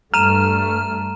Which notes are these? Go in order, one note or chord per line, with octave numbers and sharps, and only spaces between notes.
G2 A3 A#5 F6 D#7 E7